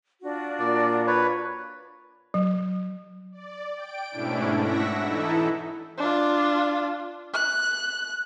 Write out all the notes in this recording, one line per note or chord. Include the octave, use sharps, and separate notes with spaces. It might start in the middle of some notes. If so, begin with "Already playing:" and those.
D4 F4 F#4
A#2 D5
B4 C#5
F#3
D5
G5 D7
G#2 B2 A3 C#4 D4 E4
E5 F#5 C#6 E6 A#6 B6
E3 D#4 E4 A4
D4 F4
F#6